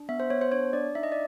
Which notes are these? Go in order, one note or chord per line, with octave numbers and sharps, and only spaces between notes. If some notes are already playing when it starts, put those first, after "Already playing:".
Already playing: D4
B3 E5
C5
B3 C#5
C5
D4 C#5
D4 D5
D#4 E5
D#5
D5